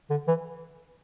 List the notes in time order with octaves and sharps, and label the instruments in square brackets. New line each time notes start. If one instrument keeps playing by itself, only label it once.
[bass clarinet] D3
E3